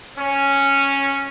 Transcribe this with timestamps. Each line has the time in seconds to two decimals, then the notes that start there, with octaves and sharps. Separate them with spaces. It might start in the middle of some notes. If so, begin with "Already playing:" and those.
0.18 C#4